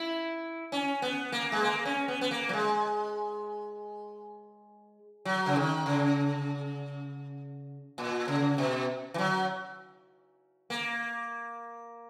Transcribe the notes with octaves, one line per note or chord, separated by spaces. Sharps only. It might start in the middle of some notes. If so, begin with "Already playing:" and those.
Already playing: E4
C#4
B3
A#3
G#3
A#3
C#4
B3
B3
A#3
F#3
G#3
F#3
C#3
D#3
C#3
A#2
C#3
B2
E3
F#3
A#3